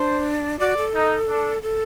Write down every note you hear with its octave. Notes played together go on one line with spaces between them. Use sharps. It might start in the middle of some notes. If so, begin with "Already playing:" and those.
Already playing: D4 C5
F#4 D5
A4
D#4
D4
A4